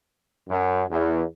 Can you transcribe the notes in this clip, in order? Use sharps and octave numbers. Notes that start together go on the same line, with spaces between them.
F#2
E2